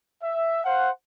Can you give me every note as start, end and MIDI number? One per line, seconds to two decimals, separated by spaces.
0.23 0.64 76
0.64 0.90 72
0.64 0.90 77
0.64 0.90 78